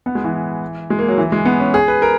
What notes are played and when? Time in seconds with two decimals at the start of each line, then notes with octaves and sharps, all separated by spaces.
0.06 B3
0.15 G#3
0.24 E3
0.90 G#3
0.99 A#3
1.08 F#3
1.18 E3
1.32 G#3
1.45 B3
1.60 C#4
1.74 G#4
1.88 B4
2.02 A#4